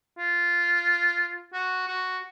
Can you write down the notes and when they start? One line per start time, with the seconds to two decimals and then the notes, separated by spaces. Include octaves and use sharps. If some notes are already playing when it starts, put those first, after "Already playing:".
0.18 F4
1.54 F#4
1.87 F#4